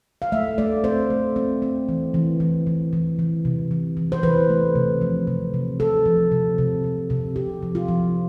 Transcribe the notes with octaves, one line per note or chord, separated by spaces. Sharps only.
F5
A3 E5
A3 D5
C4 C5
A3
C4
C4
E3
E3
E3
E3
E3
E3
C3
E3
E3
C5
E3 B4
A3
C3
F3
C3
C3
C3 A4
F3
C3
C3
C3
C3
C3 G4
F3
F4
F3